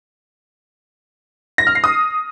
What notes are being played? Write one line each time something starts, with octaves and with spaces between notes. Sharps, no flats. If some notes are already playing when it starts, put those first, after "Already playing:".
A#6
F6
C7
D#6